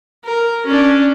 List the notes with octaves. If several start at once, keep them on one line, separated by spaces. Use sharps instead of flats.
A#4
C#4 D4